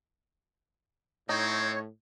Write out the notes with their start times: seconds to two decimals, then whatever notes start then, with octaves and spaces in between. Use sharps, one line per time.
1.29 A2 C4 D#4 C#5